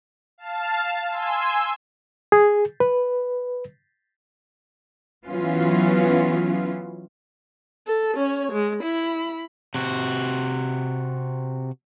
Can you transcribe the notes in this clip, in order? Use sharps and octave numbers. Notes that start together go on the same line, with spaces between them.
F5 A5
G#5 C6 E6
G#4
B4
E3 F#3 B3 C#4 F4
A4
C#4 C#5
G#3
E4 B5
C3 F#4